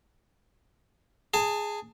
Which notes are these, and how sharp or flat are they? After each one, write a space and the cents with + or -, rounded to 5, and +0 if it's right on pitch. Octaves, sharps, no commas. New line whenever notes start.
G#4 +0 A5 +25